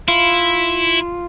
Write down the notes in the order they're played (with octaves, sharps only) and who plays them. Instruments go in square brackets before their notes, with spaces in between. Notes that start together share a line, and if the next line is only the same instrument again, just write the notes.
[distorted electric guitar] E4 [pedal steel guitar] F4